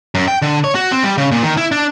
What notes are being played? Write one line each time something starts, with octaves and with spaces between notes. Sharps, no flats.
F#2
G5
D3
C#5
F#4
C4
G3
C#3
A#2
D#3
E4
D4